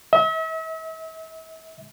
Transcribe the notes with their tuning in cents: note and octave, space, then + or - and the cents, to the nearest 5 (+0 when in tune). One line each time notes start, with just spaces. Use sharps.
E5 -40